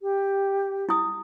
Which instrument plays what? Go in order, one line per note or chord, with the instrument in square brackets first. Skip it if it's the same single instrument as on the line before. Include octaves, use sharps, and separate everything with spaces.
[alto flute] G4
[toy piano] E4 D#6